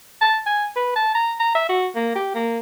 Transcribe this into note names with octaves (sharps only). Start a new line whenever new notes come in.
A5
G#5
B4
A5
A#5
A#5
E5
F#4
A#3
G4
A#3